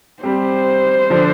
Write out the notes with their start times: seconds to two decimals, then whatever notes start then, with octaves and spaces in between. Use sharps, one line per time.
0.23 G3 C4 G4 C5
1.10 D3 F3 D4